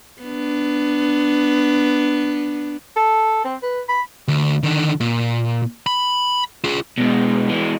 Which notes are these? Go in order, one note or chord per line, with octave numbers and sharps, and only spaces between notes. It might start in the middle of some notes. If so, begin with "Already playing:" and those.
B3 D4
A4
C4
B4
B5
D2
D3 D#3
A#2
B5
F4 G#4
B2 G#3
E3 G#3